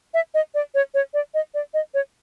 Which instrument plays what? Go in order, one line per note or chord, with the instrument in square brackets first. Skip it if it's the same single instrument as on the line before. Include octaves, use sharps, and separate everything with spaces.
[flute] E5
D#5
D5
C#5
C#5
D5
D#5
D5
D#5
C#5